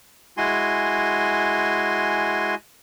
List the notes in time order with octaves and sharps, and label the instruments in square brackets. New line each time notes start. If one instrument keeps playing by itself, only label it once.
[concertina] G#3 E4 F#4 G#5 C6